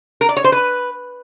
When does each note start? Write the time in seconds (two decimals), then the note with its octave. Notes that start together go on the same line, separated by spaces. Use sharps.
0.21 A#4
0.29 D5
0.37 C#5
0.44 C5
0.52 B4